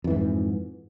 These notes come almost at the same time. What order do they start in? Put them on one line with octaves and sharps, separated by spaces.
F2 E3 G#2